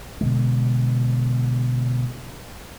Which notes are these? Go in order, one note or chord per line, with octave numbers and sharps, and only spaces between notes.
B2 D3 G#3